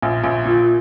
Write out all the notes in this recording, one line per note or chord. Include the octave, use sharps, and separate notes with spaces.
A#1
A#1
A#2